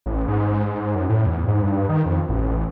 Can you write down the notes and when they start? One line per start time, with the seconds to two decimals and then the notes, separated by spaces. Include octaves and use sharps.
0.06 A1
0.28 G#2
0.95 F#2
1.09 A2
1.26 E2
1.48 G#2
1.62 G2
1.89 D#3
2.06 F2
2.29 A1